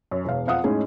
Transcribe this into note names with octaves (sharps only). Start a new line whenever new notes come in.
F#2
E1 F5
F2 F3 F5 F#5 D#6
A2 G#3 C#4 D#4 G#4